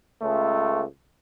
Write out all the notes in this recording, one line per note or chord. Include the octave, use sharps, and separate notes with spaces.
C#2 A3